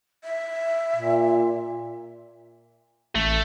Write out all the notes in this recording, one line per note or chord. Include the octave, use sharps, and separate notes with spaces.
E5
A#2
A1 A3